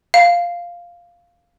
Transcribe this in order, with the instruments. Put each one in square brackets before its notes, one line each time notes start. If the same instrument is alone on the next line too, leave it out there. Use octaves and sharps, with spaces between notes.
[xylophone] F5